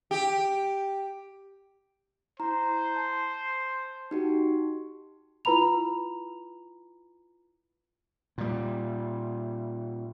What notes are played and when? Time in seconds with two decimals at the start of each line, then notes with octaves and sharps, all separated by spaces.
0.11 G4
2.40 E4 C5 A#5
2.96 A5
4.11 D#4 F#4 G4
5.45 E4 F4 B4 A#5 B5 F7
8.38 A#2 G3